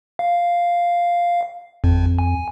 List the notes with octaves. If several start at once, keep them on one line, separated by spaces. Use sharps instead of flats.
F5
G#1 F2
G#5